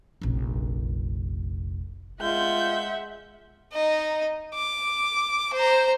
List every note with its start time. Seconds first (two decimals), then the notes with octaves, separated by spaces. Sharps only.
0.22 F1 A#1
2.21 G#3 F4 E5 F#5 G6
3.73 D#4 D#5
4.55 D6
5.53 C5 A#5